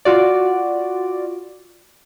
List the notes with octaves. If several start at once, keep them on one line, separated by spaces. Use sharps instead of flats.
F4 F#4 D5